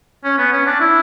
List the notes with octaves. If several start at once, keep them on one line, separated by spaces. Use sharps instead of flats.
C#4
B3
C#4
D4
E4